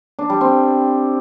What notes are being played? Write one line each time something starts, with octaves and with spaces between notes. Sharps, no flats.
D4
G3
C4